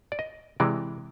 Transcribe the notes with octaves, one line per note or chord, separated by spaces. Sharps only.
D5
D#5
C3 E3 G#3 D5